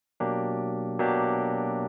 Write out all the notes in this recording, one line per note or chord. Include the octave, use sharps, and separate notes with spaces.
B2 F#3 A#3 D4 G4
B2 F#3 A#3 D4 G4